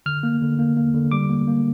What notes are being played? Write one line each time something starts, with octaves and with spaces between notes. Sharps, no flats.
D3 F6
A#3
D3
A#3
A#3
D3
G3 D6
A#3
A#3